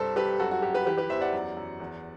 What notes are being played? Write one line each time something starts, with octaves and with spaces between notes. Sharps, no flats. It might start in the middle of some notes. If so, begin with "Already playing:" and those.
Already playing: C2 G2 A4 C5
G2 G4 B4
F#2 F#4 A4
F#4
F#2 G4
G4 B4
E3 G4 B4
G4 B4
E2 C5 E5
D5 F#5
F#2
F#2
E2